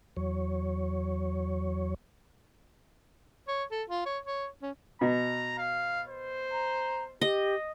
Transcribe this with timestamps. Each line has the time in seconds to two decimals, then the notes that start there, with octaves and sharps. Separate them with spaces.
0.17 E2 F#3 C#5
3.48 C#5
3.71 A4
3.89 F4
4.06 C#5
4.26 C#5
4.62 C#4
5.01 B2 A#5
5.58 F5
6.08 C5
6.52 A#5
7.21 G4 D#5